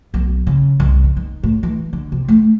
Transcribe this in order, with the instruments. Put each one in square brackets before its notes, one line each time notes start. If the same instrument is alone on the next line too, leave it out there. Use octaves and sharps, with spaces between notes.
[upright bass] B1
C#3
C2
C#3
D#3
A2
E3
D3
C3
A3